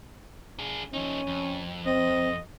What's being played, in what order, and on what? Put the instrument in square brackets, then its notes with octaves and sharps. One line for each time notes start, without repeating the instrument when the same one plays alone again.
[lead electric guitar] D4 G#4
[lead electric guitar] F3 D#4 [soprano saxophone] C#4
[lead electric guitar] F2
[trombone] C4 [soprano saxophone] D#5